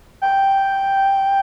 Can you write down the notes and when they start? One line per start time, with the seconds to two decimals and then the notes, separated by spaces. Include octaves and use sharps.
0.22 G5